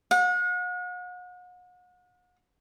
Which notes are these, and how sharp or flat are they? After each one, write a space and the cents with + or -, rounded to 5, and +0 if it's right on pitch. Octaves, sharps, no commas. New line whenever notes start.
F#5 -40